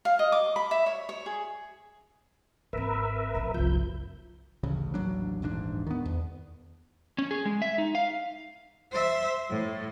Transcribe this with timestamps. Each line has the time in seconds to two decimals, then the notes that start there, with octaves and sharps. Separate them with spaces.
0.05 F5
0.19 D#5
0.32 D6
0.56 B5
0.71 E5
0.86 C#5
1.09 C#5
1.26 G#4
2.73 G#1 C4 A#4 B4 E5
3.35 A#1 A2
3.54 F#1 C2 F3 G6
4.63 A1 D2 C#3
4.94 A1 D#2 F#3 D4
5.42 D#1 A1 G#2 D4
5.87 D#3 B3
6.05 E2
7.18 C#4
7.31 G#4
7.45 G#3
7.62 E5
7.78 D#4
7.95 F5
8.91 C5 E5
9.49 A2